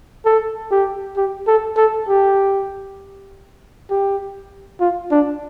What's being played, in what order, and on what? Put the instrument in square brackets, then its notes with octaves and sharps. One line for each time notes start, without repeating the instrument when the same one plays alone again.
[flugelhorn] A4
G4
G4
A4
A4
G4
G4
F4
D4